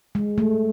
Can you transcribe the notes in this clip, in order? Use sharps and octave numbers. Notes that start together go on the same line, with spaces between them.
G#3
A3